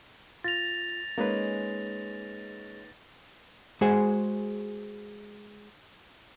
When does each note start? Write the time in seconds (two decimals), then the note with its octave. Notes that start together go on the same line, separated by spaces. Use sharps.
0.44 F4 A6 A#6 F7
1.18 G#3 A#3 C#4 D#4 B4
3.81 G#3 F#4 G#4 C5 G#5